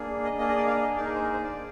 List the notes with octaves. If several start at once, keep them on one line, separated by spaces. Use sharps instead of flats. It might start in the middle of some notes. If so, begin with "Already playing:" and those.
Already playing: A#3 D4 G#4
D#5
A#3 D4 G#4 D#5
D#5
D5
F5
D#5
A#3 D#4 G#4 D5
A#4
C5
A#4
C5
D5
D4 G#4